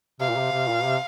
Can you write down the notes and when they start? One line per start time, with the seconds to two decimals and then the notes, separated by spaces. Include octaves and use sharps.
0.20 C3 F5
0.30 A#2
0.36 C3
0.52 C3
0.69 A#2
0.84 C3